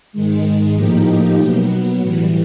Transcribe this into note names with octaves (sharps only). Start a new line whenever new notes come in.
G#2 D#3 G#3
A2 F3 A#3 D#4 G4
B2 F#3 B3
A2 E3 G3